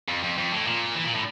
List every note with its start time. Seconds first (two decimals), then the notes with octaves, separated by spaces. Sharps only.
0.08 F2
0.23 F2
0.37 F2
0.52 A2
0.67 A#2
0.95 E3
1.06 A#2
1.15 A2